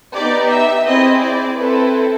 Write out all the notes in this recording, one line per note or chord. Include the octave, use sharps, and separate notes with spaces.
B3 D#4 G4 D5
E5
C4 E4 G#4 D#5
D5
C4 E4 A4 B4